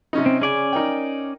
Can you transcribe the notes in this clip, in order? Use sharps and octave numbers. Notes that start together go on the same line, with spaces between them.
C3 C#4 D#4
C4
C#3 C#4 D5 G#5
D#4 A#4 G5